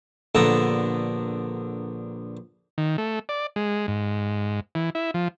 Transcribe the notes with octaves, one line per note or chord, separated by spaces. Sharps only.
A#1 D3 B3 A4 A#5
D#3
A3
D5
G#3
G#2
E3
E4
F3